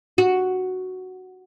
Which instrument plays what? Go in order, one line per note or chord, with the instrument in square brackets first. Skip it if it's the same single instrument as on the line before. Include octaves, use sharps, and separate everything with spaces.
[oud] F#4